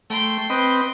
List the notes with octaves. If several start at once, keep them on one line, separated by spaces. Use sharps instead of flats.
A3 G5 C6
C4 B4 D#5